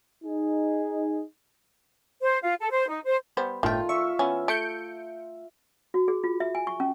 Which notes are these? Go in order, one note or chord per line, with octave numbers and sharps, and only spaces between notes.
D#4 G#4
C5
F4
A4
C5
D#4
C5
G3 B3 C5
G1 A2 D#3 A3 F4 G5
E5 C#6
E3 B3 C#4
A3 G6 C#7 D7
F#4
G#4
F4
E5
G#5
C#6
C#4